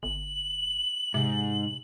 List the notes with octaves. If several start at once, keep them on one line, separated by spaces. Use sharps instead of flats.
G1 F#7
G#2 C3